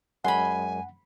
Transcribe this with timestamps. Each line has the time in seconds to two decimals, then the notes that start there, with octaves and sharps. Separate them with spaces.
0.24 F#2 G#3 C#4 F#5 G#5 B5 C6